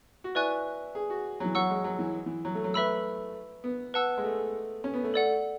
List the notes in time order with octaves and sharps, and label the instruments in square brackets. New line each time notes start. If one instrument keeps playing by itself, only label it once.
[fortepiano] F#4
[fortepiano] E4 [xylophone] B4 D5 G#5 C#6 F#6
[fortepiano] G#4
F#4
F#3
E3
[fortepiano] F#3 [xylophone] F#5 C#6 E6
[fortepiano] G#3
F#3
E3
E3
F#3
A3
F#3
[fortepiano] A3 [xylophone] B4 E5 B5 E6
[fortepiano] B3
[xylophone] B4 F#5 A5 E6
[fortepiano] G#3
A3
C#4
B3
A3
[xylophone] A4 D5 F#5